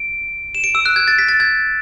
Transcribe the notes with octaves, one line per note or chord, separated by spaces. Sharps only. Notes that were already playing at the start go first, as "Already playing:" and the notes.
Already playing: D7
E7
D7
E6
F#6
G#6
A6
B6
A6
G#6